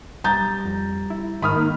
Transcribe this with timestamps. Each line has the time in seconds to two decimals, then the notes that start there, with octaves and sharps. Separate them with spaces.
0.24 B1 G3 A#5 G6 A6
0.65 F2
1.10 E4
1.42 G#2 D#3 B5 D#6 F6
1.56 A#3